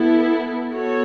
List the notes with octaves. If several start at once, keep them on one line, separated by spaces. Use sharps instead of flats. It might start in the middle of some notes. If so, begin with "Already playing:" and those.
Already playing: B3 E4 A4
B3 F#4 A4 C#5